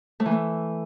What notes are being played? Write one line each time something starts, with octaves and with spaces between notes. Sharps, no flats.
A3
E3
A3